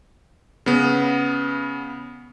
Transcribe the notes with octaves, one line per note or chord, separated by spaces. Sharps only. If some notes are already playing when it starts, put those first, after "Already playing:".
C#3 B3